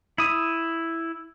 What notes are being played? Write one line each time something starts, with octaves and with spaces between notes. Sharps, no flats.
E4 D#6